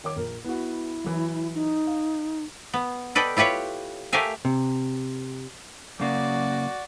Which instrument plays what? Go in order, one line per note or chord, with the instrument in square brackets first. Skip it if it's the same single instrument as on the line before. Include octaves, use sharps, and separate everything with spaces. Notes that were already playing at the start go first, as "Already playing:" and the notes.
[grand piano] D#3 C#5 D6
A#1 A#4
[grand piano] B3 F#4 [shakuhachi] E4
[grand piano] E3 F#3
[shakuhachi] D#4
[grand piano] F5
[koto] B3
A4 B4 D5 D#5 G5
E4 F4 G4 B4 C#5
A3 G4 A#4 E5 F5 G#5
[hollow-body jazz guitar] C3
[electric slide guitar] F#2 C#3 A#3 [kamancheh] F#4 D5